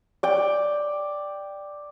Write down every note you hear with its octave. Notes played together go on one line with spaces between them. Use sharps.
D5 G5